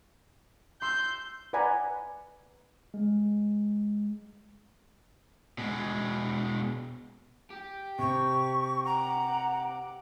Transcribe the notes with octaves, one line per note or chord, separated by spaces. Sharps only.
C6 E6 G6
B4 D5 F#5 G#5 A#5 B5
G#3
B2 G#3
G4
C3 C#6
F#5 A#5 D6